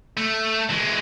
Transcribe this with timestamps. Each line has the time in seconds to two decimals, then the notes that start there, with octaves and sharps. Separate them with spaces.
0.17 A3
0.70 E3 G#3